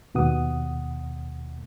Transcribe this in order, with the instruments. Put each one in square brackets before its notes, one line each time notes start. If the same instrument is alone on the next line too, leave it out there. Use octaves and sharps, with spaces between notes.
[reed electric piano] D#2 B2 F#5 D#6